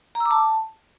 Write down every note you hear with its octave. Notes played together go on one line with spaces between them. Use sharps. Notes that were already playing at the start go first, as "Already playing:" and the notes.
A#5
E6
D6
A5